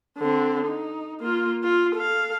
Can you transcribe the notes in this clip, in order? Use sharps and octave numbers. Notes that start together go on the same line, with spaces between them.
D3 C4
D#4
A#3 F4
F4
A4 F5